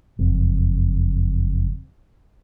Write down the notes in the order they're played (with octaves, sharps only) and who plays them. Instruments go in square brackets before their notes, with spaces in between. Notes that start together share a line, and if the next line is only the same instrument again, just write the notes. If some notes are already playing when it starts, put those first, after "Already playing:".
[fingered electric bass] F#1 F2